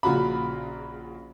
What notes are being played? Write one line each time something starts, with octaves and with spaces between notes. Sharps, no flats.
A#1 C#3 F4 F#4 A#5 B5